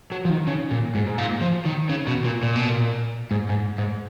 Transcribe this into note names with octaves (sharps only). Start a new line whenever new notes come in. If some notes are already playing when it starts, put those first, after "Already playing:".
F#3
F3
D#3
C#3
A#2
G#2
G#2
A#2
F3
D#3
C#3
B2
A#2
A#2
B2
A#2
G#2
G#2
G#2